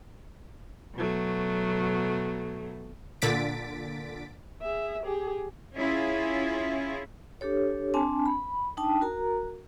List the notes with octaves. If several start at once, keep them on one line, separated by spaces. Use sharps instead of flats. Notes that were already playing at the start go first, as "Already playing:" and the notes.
B2 F#3 A3
A#2 D3 A6 B6 D7
G#4 E5
G4 G#4
C#4 E4 F4 G#4
D4 G4 A4 C#5
C4 D4 G#5 A5
B5
D4 D#4 G5 A5
F#4 A#4 A#5